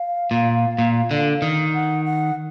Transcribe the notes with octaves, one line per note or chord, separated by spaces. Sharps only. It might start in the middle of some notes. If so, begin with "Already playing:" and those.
Already playing: F5
A#2
A#2
D3
D#3
F#5
F#5